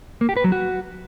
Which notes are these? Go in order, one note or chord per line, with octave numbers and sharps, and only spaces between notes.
A#3
G4
B4
F#3
F#4